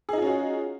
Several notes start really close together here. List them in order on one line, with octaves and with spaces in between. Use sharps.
G#4 D#4 F4 C#4 F#4